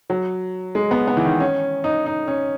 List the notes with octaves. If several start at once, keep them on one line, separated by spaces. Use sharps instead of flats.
F#3
G#3
B3
B3
E3
D#3
C#4
D#4
D#4
C#4